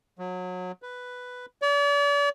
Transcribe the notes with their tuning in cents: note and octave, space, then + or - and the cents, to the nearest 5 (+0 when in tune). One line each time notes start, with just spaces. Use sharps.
F#3 -25
B4 +5
D5 -40